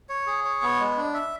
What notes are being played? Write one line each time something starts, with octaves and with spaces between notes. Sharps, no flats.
C#5
G#4
C#5
B3
G#3
D4
E5